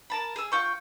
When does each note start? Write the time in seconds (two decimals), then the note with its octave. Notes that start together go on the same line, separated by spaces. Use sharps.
0.10 A#4 A5 B5
0.36 G#4 E6
0.52 F4 G5 C#6